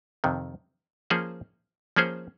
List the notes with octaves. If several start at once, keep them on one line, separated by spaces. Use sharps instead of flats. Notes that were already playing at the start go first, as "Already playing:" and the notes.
F2 C3 D#3
F3 A#3 C#4 G#4 C5
F3 A#3 C#4 G#4 C5